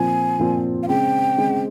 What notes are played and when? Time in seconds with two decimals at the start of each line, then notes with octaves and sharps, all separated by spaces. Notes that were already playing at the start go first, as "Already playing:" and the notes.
Already playing: A#2 F3 C4 F4 G#5
0.40 A#2 F3 C4 F4
0.83 F5
0.89 C#3 G#3 C4 G5
1.38 C#3 G#3 C4